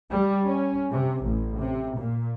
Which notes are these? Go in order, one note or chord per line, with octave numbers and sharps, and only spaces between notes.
G3
C#4
C3
A1
C3
A#2